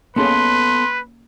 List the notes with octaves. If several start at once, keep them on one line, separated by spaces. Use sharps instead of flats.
A#3 B3 C#4 G#4 A4 B4 C6